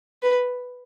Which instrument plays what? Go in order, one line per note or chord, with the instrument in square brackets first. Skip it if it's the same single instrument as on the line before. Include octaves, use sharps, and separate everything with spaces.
[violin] B4